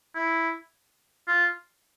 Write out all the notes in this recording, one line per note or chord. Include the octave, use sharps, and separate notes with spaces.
E4
F4